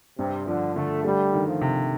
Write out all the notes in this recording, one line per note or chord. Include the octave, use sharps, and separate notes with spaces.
G2 C3
D3 F3
D3 A3
G3 A3
D#3
F3
C3